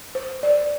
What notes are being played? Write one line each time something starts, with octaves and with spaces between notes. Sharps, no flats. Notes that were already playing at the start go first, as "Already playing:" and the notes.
C5
D5